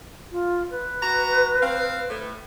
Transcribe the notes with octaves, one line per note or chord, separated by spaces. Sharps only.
F4
B4
F#4 A#5
C4 F5
A2